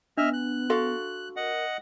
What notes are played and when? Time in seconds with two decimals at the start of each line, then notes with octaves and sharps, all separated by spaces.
0.17 B3 D4 D#5 E5 F6
0.33 F#6
0.70 F#4 A4 F5 C6
1.36 A#4 D#5 F#5